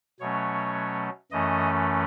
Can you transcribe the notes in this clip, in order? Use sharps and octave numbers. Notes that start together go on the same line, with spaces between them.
B2 F#3 A3 C#4 C#5
F#2 E3 A3 C#4 D#5